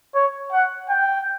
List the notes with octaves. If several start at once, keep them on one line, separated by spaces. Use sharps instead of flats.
C#5
F#5
G5